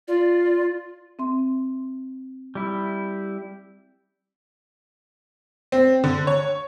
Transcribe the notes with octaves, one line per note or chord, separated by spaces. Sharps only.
F4 D5
C4 E5 C6
G3 E4
C4
D3
C#5